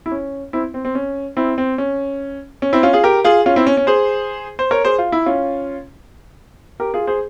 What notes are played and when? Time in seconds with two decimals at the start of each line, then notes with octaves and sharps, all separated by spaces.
0.06 E4
0.12 C#4
0.53 C4 E4
0.74 C4
0.85 C4
0.95 C#4
1.37 C4 E4
1.58 C4
1.78 C#4
2.62 C#4
2.73 C4 E4
2.83 C#4 F4
2.93 F4 G#4
3.04 G4 A#4
3.24 F4 G#4
3.46 C#4 F4
3.56 C4 E4
3.67 C#4
3.77 C#4
3.87 G#4 C5
4.59 C5
4.71 A#4 C#5
4.85 G#4 C5
4.98 F4
5.12 E4
5.26 C#4 F4
6.80 G4 A#4
6.94 F4 G#4
7.07 G#4 C5